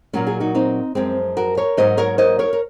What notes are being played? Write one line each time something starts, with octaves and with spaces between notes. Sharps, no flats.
A#2 F#3 A#3 C#4 F4
F4 G#4
D#4 F#4
C4 D#4
F#2 F3 G#3 C4
F#4 A#4
A#4 C#5
G#2 F#3 A#3 C5 D#5
A#4 C#5
C5 D#5
A#4 C#5
A#4